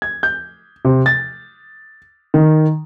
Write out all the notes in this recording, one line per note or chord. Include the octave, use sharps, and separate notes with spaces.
G#6
G6
C3
A6
D#3